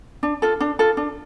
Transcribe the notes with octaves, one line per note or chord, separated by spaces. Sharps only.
D4
F4 A4
D4
F4 A4
D4